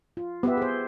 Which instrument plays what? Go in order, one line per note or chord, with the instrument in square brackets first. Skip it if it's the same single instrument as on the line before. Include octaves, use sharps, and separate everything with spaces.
[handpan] F4
[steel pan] B3 [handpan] G4 B4 E5
[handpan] G#4 C5